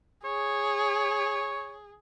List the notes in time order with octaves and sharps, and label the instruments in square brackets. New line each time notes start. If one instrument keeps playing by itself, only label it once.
[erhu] G#4 [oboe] C#5